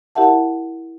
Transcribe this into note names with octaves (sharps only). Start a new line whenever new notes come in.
E4 G4 A#4 E5 F#5 A5